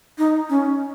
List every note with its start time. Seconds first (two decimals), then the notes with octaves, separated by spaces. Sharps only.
0.18 D#4
0.49 C#4